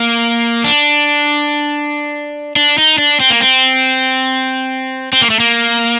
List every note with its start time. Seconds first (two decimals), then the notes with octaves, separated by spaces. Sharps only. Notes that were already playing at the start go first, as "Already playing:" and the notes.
Already playing: A#3
0.64 D4
2.56 D4
2.78 D#4
2.98 D4
3.20 C4
3.30 A#3
3.40 C4
5.13 C4
5.21 A#3
5.30 A3
5.40 A#3